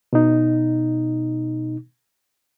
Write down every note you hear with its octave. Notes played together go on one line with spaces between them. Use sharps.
B2 D#4